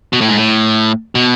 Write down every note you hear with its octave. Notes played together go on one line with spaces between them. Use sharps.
B2
A2
G#2
A2
B2